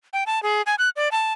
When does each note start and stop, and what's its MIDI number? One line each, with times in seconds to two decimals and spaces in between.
0.13 0.24 79
0.26 0.42 81
0.43 0.62 68
0.66 0.75 80
0.79 0.89 90
0.96 1.09 74
1.12 1.33 81